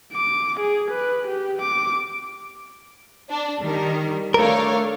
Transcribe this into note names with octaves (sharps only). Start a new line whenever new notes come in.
D6
G#4
B4
G4
D6
D4
D#3 G3 A#4
A3 D4 A#4 C#5 F5